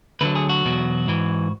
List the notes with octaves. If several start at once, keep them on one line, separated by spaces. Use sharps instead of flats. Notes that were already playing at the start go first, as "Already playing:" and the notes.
D2 D3 F#3 B4
G#4
F#4
E2 B2 F#3
G#2 E3